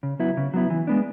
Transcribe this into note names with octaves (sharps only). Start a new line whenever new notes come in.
C#3
F#3 B3 E4
C#3
F#3 B3 E4
E3
G#3 B3 D4